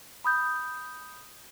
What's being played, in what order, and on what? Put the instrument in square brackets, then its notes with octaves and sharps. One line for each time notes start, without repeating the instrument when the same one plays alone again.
[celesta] B5 D#6 G6